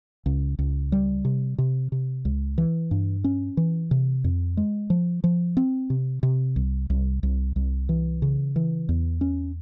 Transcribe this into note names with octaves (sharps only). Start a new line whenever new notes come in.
C#2
C#2
G3
C3
C3
C3
C#2
E3
G2
C#4
E3
C3
F2
G#3
F3
F3
C4
C3
C3
C2
C2
C2
C2
E3
C#3
E3
E2
C#4